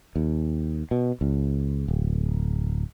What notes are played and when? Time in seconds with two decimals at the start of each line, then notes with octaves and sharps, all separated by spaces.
0.16 D#2
0.91 B2
1.21 C#2
1.88 D1